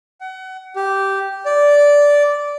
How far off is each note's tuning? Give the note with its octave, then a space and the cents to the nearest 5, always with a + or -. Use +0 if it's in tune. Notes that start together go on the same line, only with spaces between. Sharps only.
F#5 +30
G4 -10
D5 -10